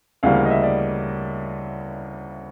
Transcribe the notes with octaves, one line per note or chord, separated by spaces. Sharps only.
D2 C#3 E3 G3 A#3 F5
F5
D#5
E5
D5